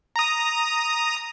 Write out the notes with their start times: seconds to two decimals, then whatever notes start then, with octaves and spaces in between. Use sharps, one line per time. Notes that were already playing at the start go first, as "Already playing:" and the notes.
0.16 A#5 D#6